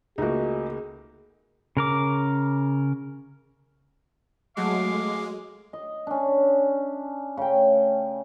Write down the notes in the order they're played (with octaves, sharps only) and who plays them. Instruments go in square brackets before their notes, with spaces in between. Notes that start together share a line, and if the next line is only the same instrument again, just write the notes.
[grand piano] C#2 A3 A#3 [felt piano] D#4 F#4 [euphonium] G#4
[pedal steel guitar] C#3 A#4 D6
[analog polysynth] F#3 A3 F#4 [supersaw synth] G#3 [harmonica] F5 D6
[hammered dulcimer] D#5
C#4 D4
C#3 A3 G5